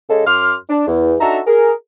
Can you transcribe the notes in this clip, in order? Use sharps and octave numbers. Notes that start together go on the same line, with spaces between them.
C#3 G#3 A4
F#2 C6 D6 F6
D4
E2
D4 D#4 F#4 A4 E5 A#5
G#4 A#4